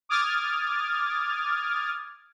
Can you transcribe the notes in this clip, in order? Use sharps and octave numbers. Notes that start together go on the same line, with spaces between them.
D6 D#6 F6 G#6 A6